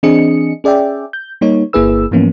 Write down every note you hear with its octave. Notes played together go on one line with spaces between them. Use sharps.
E3 C4 D4 G#4 D#5 C#7
C#4 G#4 D5 E5 G5
G6
G3 A#3 D#4 C#5
G1 A#3 E4 G#4 B4 E6
G#2 E3 F3 A#3 B3 C#4